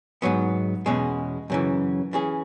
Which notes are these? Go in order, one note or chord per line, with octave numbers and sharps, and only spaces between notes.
G#2 F#3 B3
E2 B2 G#3 C#4
F#2 C#3 E3
E3 C#4 G#4